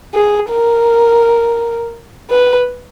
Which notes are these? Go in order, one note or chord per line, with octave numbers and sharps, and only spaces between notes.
G#4
A#4
B4